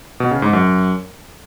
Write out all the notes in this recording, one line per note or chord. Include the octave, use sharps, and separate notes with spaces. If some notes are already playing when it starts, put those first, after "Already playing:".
B2
C#3
G#2
F#2